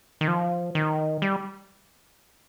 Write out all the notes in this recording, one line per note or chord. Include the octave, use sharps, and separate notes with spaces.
D#3
F3
D#3
G3